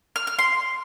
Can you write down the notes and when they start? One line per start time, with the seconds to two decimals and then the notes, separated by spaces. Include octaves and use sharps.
0.16 F6
0.27 F6
0.39 C6